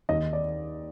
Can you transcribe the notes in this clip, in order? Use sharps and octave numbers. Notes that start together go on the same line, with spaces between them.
D#2 D#5
D5